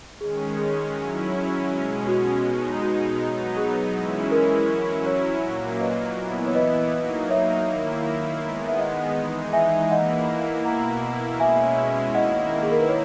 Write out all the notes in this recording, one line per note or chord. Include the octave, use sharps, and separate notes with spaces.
D#3 G#3 C#4 G#4
G#4
F#3 C#4 E4
B2 G#3 C#4
F#4
B2 G#3 D#4
F#4
F#3 B3 D#4
G#4
E3 G#3 C#4 E4
A#4
F#3 C#4 E4
C#5
A#2 F#3 A#3
B4 D#5
E3 B3 E4
C#5
B4 D#5
F#3 A#3 D#4
C#5 E5
D#3 A#3 E4
D#3 G#3 B3
E5
D#5 F#5
E3 G#3 D#4
E5 G#5
E3 A#3 E4 D#5 F#5
B2 A#3 E4 F#5 A#5
B2 G#3 C#4 E4 E5 G#5
D#3 A#3 E4 D#5 F#5
G#4
A#4
B4
C#5